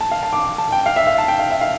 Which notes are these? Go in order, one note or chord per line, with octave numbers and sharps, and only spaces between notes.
A5
F5
A5
D6
A5
G5
F5
E5
F5
A5
G5
F5
E5
F5